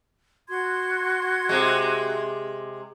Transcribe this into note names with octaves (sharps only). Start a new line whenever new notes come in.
F#4 C6 G#6
C3 G#3